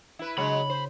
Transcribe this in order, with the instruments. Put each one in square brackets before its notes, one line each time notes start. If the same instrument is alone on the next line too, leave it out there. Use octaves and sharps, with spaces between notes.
[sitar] E4 B4
[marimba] C#3 D4 [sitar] F#3 G#3 C#5 [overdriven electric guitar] B5
[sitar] C5